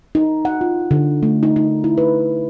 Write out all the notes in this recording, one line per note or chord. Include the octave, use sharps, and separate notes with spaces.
D#4
F#5
F4
D3
A3
D#4
D#4
E4
B4